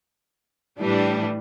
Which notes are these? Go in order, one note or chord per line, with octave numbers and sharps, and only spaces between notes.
A2 E3 G3 D4